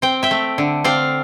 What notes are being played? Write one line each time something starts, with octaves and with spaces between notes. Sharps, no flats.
C4 G5
E5 G5
A3
D3
C4 D5 F5